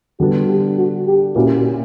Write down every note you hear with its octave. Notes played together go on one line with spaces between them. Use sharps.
D3 G3 B3 D4 F#4
G4
F#4
G4
A#2 A#3 C#4 E4 F#4 G4